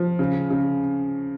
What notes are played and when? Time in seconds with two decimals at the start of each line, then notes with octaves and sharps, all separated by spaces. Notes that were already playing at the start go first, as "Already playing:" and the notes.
Already playing: F3
0.19 C#3
0.50 C#3